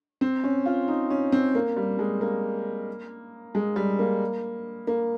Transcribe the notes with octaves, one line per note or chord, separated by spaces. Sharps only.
C4
C#4
F4
D#4
C#4
C4
A#3
G3
G#3
A#3
G#3
G3
A#3
A#3